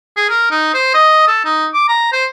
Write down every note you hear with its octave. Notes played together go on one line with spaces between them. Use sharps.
G#4
A#4
D#4
C5
D#5
A4
D#4
D6
A#5
C5